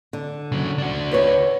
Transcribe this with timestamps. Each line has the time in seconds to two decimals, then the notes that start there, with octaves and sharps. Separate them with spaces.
0.13 D3
0.52 C#3 F#3
0.78 D4 F#4
1.12 D2 B4 C#5